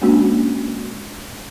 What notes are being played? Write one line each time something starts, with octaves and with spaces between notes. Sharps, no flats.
G#3 A#3 C#4 D4 F#4